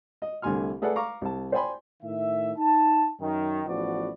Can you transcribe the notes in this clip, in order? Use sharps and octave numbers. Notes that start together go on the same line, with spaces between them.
D#5
C2 D3 A3 G#5 C6 F6
A3 G#4 A4 B4 D5 F#5
F5 A#5 C#6 D6
C2 A5
C5 D5 G5 G#5 B5 C6
A2 D#3 E5
D#4 A5
F#2 D#3
A1 F3 B3 F#4 D5